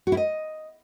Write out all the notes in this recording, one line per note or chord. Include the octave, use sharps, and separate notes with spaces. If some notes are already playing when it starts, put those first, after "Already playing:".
F#4
E4
D#5